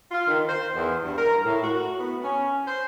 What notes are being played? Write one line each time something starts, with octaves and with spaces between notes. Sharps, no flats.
F4
D#3
C5
E2
G2
A#4
A2
F#4
B3
C#4
C5